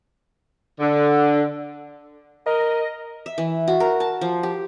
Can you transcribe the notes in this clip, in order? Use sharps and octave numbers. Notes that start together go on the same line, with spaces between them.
D3
A#4 D#5
E5
E3
F#4
A#4
A5
F3
G4